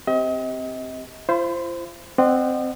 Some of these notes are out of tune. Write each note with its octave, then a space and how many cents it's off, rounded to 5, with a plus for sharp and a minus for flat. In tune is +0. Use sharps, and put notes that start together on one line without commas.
C4 +0 G4 +0 D#5 +35
F4 -40 C5 +0 B5 +35
C4 -10 D#5 -40 F#5 +0